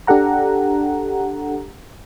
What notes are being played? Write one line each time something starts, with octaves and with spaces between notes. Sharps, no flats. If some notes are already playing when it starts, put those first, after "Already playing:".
D4 G4 A4 F#5 A#5